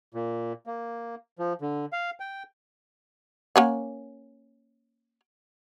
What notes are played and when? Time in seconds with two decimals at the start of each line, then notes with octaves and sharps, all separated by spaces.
0.14 A#2
0.67 A#3
1.39 F3
1.61 D3
1.93 F5
2.20 G5
3.56 A#3 C#4 F#5